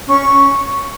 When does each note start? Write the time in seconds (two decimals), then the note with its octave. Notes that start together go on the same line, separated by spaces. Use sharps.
0.06 C#4 C#6